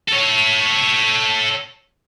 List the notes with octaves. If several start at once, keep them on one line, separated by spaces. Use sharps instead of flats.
A4 C#5